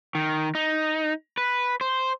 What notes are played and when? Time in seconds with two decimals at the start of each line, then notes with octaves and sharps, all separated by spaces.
0.15 D#3
0.55 D#4
1.37 B4
1.81 C5